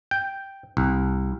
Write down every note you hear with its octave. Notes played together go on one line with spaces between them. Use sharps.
G5
C2